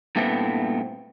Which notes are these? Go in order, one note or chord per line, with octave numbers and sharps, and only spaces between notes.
G2 A#2 A3 B3 C4 E4